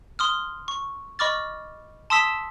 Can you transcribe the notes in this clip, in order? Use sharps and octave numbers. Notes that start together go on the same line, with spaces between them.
C6 D#6 F6
C#6
D#5 B5 C#6 D6 F6 A6
A5 C6 D#6 E6 B6 E7